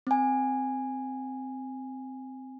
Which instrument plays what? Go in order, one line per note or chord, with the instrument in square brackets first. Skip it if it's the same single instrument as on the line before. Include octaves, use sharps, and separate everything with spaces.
[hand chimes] C4 G#5